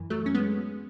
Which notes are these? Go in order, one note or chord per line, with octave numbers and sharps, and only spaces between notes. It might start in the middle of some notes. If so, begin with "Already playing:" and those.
Already playing: F#2 E3
F#3 A3
C#4
G#3 B3